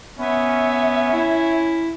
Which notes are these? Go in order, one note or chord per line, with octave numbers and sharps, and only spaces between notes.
B3 C#4 E5
E4